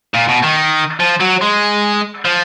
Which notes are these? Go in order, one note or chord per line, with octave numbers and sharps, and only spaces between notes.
A#2
B2
D#3
F3
F#3
G#3
F3